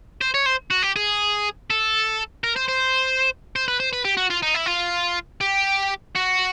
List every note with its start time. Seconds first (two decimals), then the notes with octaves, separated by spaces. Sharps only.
0.21 C5
0.34 C#5
0.46 C5
0.71 F#4
0.83 G4
0.96 G#4
1.70 A4
2.44 A#4
2.56 C5
2.69 C5
3.56 C5
3.68 B4
3.80 C5
3.93 B4
4.05 G4
4.17 F#4
4.30 F4
4.42 D#4
4.54 E4
4.66 F4
5.41 G4
6.15 F#4